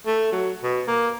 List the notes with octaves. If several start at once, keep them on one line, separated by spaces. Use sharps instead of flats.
A3
F#3
B2
A#3